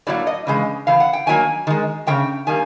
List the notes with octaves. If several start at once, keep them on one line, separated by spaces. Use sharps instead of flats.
A2 F#3 A#3 D5
D#5
C#3 E3 G#3
C#3 E3 F5
F#5
G5
D#3 F#3 A#3 G#5
D#3 G#3
C#3 F3 A3 G5
D#3 G3 A#3 G#5